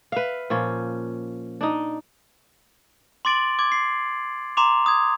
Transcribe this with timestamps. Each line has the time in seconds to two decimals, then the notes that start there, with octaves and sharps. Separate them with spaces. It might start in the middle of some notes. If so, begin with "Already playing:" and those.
0.12 B4 E5 F5
0.50 A#2 F3 C#4
1.61 D4 D#4
3.25 C6 D6 A6 D7 F#7
3.59 D6 G#6
3.72 C7
4.57 A#5 C6 D6 F7
4.86 D#6 G#6